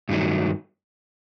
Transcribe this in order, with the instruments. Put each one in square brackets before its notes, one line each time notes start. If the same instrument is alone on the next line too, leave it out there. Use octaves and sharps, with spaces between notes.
[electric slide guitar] G2 D#3 F#3 A3